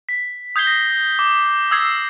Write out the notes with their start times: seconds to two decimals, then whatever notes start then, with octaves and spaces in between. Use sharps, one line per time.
0.09 B6
0.56 D#6 G6 G#6 C7 G7
0.67 A#6
1.19 D6
1.71 D#6 E6 G#6 C7